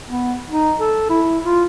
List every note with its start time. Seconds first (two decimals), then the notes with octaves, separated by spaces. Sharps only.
0.08 B3
0.51 D#4
0.80 A4
1.10 E4
1.45 F4